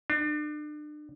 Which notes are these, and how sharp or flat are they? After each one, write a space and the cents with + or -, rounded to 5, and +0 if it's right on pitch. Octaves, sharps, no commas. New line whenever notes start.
D4 +35